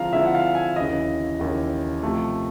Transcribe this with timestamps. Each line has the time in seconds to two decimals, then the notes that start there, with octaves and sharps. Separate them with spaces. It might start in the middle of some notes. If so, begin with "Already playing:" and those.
Already playing: D3 F3 G#3 C4 E4 F5 A#5
0.13 D3 F3 G#3 C4 E4 E5
0.26 F#5
0.34 F5
0.55 G#5
0.76 D#2 C#3 E3 D#5
1.39 D#2 C#3 E3
2.03 C3 F3 A3